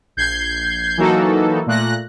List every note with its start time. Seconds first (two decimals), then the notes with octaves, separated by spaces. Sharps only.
0.17 A#1 G6 G#6 C7
0.97 E3 F#3 A#3 D#4 F#4 A4
1.67 A#2 A3 F#6 A#6